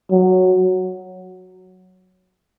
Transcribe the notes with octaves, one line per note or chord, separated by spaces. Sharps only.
F#3